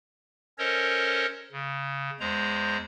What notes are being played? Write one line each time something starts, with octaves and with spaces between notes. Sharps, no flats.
C#4 A4 A#4 C5 C#5 D#5
C#3
E2 G#3 C5 A#5